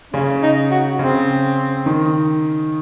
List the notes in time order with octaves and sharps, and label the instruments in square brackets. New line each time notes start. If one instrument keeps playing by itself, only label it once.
[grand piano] C#3 [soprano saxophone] C#4
[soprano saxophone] D#4
F#4
[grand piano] C#3 [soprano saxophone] C4
[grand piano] D#3